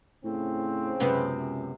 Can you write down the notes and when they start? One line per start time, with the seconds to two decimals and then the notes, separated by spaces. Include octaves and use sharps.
0.24 A2 C#3 C4
1.00 C#2 F#2 C3 B3